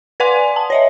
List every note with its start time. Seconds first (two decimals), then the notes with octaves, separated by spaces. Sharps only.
0.20 B4 D5 F#5 G#5 C6
0.56 A5
0.70 C#5 D#5 E5